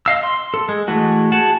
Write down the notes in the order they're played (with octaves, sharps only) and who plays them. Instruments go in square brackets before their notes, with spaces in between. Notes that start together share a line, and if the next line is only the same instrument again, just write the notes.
[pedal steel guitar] D#5 F5 E6
C6
A4
G#3
E3 G#3 A3 F#4
F#4 G#4 F#5 A5